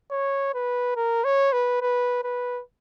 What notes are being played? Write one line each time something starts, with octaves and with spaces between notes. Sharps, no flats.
C#5
B4
A#4
C#5
B4
B4
B4